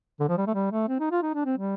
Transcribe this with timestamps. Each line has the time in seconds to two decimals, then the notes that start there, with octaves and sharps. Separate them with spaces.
0.20 D3
0.29 F3
0.38 G3
0.47 A3
0.54 G3
0.71 A3
0.88 C4
0.99 D#4
1.11 F4
1.22 D#4
1.34 D4
1.45 C4
1.57 G3